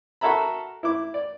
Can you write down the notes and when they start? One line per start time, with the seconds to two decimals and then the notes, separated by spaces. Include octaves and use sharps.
0.21 F#4 A4 A#4 E5 A#5 B5
0.83 E4 D6
1.14 D5